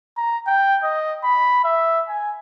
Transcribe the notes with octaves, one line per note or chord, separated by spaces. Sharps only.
A#5
G5
D#5
B5
E5
G#5